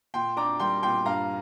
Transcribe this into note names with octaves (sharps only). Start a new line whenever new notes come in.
A#2 G5 C6
D4 A#5 D6
G3 G5 C6
A#2 G5 C6
G2 F5 A#5